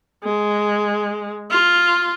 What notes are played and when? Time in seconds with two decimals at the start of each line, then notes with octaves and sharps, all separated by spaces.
0.24 G#3
1.51 F4